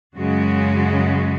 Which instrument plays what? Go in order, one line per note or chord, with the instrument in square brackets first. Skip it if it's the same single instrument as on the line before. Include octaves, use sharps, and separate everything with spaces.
[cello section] F#2 C#3 G#3 F#4